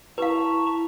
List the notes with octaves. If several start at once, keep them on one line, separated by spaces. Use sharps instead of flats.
E4 B4 F5 A5 A#5 C#6